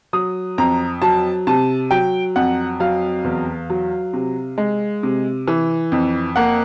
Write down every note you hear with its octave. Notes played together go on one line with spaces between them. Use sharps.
F#3 D#6
F2 A#5
F#3 A5
C3 A5
F#3 G5
F2 F#5
F#3 F5
E2
F#3
C3
G#3
C3
E3
F2
A#3 F#5